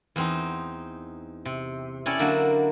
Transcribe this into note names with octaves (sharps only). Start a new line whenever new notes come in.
E2 C4 D#4
C3
C#4 E4 G4 A4 C#5 D5
D3 F#3 A#3 D4